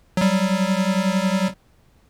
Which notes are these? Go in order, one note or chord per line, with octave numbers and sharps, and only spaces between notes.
F#3 G3